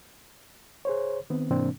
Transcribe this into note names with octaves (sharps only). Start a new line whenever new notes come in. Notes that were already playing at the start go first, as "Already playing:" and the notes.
G#4 C5 C#5
D#3 B3 C4
G#2 C3 E3 A#3 C4 D4